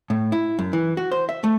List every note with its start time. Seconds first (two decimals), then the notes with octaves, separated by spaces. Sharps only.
0.10 A2
0.32 E4
0.59 F#2
0.73 E3
0.97 F#4
1.12 C5
1.29 E5
1.44 A3